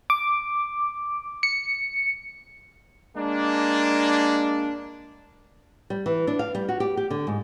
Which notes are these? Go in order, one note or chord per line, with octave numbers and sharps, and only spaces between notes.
D6
C#7
G#3 A#3 D4
G3
E3
D4
F5
G3
F#4
G4
G4
D3
G#2